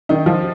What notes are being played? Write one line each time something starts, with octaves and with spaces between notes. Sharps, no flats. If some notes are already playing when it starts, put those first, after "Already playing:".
D#3 D#4
F3 F4